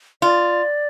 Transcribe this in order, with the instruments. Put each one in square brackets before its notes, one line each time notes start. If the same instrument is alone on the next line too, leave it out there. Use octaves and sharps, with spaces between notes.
[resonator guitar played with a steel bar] F4 [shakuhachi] D5